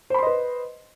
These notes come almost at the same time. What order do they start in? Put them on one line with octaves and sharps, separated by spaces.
C5 B5 C6 D#5 B4